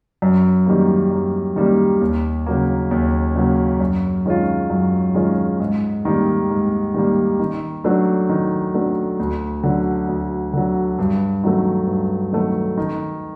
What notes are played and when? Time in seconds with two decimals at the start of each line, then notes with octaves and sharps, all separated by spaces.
0.22 F#2
0.66 D#3 G3 A#3
1.11 F#2
1.56 D#3 G3 A#3
2.01 D#2
2.46 C#3 F#3 A#3
2.91 D#2
3.35 C#3 F#3 A#3
3.80 F#2
4.26 D#3 G#3 C#4 F4
4.70 F#2
5.15 D#3 G#3 C#4 F4
5.60 G#2
6.05 D#3 G3 A#3
6.50 G#2
6.94 D#3 G3 A#3
7.39 D#3
7.84 F#3 A3 D4
8.29 D#3
8.74 F#3 A3 D4
9.19 D2
9.64 D3 F#3
10.08 D2
10.53 D3 F#3
10.99 G2
11.44 D#3 F#3 A3
11.87 G2
12.32 D#3 F#3 A3
12.77 D#3